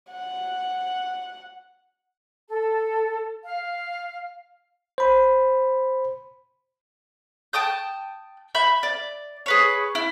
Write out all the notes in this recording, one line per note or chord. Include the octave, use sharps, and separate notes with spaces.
F#5
A4
F5
C5 B5
G5 A5 D#6 G6
E5 B5 G6
D5
G#4 B4 C#5
E4